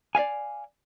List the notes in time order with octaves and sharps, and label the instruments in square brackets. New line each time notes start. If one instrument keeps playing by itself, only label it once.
[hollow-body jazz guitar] D5 E5 F5 G#5